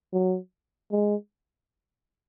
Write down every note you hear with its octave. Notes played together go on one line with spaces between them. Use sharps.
F#3
G#3